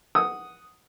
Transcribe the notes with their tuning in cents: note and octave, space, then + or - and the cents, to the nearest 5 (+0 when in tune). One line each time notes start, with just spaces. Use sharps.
F#5 +0 D#6 +0